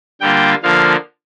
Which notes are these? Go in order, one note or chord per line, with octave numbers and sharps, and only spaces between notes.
D3 G3 A#3 F4 G5
D3 F3 A#3 F5